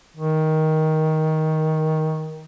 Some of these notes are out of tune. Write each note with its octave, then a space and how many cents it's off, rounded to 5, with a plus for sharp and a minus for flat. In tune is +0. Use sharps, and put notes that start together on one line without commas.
D#3 +15